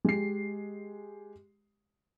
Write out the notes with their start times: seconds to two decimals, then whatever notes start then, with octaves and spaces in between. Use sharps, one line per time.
0.05 G#3 G4 C7